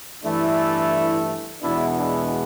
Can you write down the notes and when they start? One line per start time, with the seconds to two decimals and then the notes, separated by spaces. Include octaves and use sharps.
0.24 G2 E3 A3 D4 E4
1.62 E2 B2 G#3 B3 D4 E4
1.97 D4 E4